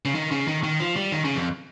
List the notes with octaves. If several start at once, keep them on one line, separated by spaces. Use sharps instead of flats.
C#3
D#3
C#3
D#3
D#3
F3
G3
D#3
C#3
F2